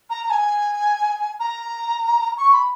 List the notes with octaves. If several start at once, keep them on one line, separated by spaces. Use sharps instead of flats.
A#5
A#5
G#5
A#5
C#6
B5